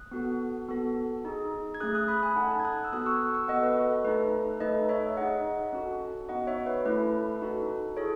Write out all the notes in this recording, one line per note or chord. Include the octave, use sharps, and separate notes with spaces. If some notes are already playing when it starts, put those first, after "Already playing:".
Already playing: D#6 F#6
B3 F#4 A4
B3 F#4 A4
D#4 G#4
G#6
A3 C#4 G#4 D#6 F#6
D#6 F#6
B5 D#6
G#5 B5
D#4 A4 F#5 A5
F#5 A5
G#6
D#6 F#6
E6
B3 F#4 A4 D#6 F#6
C#6 E6
C#6 E6
B3 F#4 A4 D#5 F#5
B4 D#5
A4
A4
A3 D#4 A4 B4
A3 D#4 A4 B4 D#5
C#5 E5
D#4 G#4 D#5 F#5
C#4 F#4 A4
B3 D#4 F#4 D#5 F#5
C#5 E5
B4
A3 C#4 E4 A4 B4
D#4 F#4 A4
E4 G#4 A4 C#5